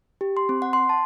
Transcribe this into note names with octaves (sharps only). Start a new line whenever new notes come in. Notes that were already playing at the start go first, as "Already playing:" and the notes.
G4
C6
C4
F#5
C6
A5